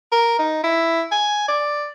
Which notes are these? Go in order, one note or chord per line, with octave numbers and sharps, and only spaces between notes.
A#4
D#4
E4
G#5
D5